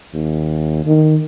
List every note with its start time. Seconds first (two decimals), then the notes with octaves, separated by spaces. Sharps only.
0.14 D#2
0.86 D#3